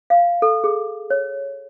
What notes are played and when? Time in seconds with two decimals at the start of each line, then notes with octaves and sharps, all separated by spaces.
0.10 F5
0.42 A4
0.64 G#4
1.10 C#5